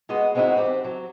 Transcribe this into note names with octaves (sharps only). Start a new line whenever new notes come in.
G#3 B3 F#4 D#5
G#3 C4 C#4 D#4 E4 F#4
F2 C4 G4
F#3